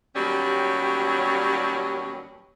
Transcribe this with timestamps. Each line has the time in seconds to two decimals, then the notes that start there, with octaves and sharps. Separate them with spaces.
0.15 D#2 B2 F#3 G3 C#4 G4